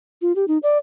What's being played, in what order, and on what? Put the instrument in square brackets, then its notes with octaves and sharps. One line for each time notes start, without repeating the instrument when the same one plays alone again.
[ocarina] F4
G4
D#4
D5